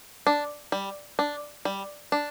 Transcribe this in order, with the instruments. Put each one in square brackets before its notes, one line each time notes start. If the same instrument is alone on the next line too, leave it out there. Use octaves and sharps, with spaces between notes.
[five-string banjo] D4
G3
D4
G3
D4